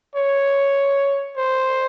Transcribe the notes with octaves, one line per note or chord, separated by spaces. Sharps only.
C#5
C5